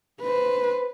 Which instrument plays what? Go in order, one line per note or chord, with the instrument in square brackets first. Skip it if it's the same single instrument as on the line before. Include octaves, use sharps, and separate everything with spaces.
[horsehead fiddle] B4 C5